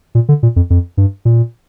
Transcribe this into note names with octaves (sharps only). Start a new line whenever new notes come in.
A#2
D3
A#2
F2
F2
G2
A#2